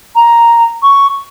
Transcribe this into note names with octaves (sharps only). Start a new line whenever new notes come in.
A#5
C#6